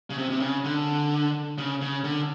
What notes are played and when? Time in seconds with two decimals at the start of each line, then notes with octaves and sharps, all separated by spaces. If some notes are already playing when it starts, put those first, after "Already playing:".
0.10 C#3
0.18 C3
0.30 C3
0.40 C#3
0.64 D3
1.58 C#3
1.81 C#3
2.04 D3